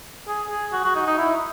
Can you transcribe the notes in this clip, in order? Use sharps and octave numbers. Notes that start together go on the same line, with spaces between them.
G#4
G#4
F#4
F#4
D#4
D#4
E4